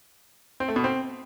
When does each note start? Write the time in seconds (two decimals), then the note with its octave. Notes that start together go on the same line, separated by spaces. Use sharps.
0.60 C4
0.68 A3
0.76 B2
0.84 C4